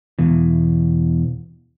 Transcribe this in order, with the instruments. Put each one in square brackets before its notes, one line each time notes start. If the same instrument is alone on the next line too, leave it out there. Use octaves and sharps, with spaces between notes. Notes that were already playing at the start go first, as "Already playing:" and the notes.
[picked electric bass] E2 B2 E3